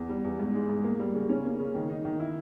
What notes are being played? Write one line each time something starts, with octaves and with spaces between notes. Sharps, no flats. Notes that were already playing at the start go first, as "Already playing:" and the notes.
Already playing: E2
G3
E2
G#2
G#3
G#2
A#3
G3
C#3
C#4
A#3
C#3
D#3
D#4
D#3
E4